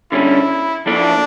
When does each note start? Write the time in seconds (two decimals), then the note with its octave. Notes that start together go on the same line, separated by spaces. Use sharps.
0.12 D3 G3 C#4 E4
0.86 F3 A#3 D4 E4 A4 D5